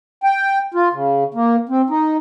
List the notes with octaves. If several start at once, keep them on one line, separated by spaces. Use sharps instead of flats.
G5
F4
C#3
A#3
C4
D#4